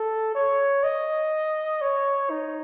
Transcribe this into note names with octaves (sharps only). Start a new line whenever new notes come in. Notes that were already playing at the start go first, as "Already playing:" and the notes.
Already playing: A4
C#5
D#5
C#5
D#4